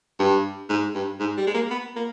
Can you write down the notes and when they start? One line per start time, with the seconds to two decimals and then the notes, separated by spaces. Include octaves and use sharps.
0.20 G2
0.69 G#2
0.95 G2
1.20 G#2
1.37 G3
1.47 G#3
1.54 A#3
1.71 B3
1.96 A#3